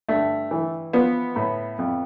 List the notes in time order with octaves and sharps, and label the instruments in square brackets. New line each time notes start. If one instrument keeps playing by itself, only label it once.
[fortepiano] G2 A3
E3
F3 B3
A2
F2